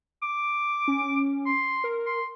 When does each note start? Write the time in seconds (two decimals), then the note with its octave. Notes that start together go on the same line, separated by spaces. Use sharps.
0.23 D6
0.88 C#4
1.46 C6
1.84 A#4
2.06 C6